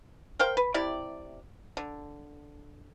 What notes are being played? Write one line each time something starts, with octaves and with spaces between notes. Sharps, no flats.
A#4 C5 F5 G5
B4
C3 E4 G4 D5
D3